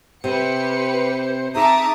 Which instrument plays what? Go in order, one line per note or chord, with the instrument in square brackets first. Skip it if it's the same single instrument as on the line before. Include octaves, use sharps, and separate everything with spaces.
[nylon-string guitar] C3 [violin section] G4 B4 C#7 [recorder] C5
[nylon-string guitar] C4 D#4 G#4 [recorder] E5 [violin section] A5 D6 D#6 [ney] A#5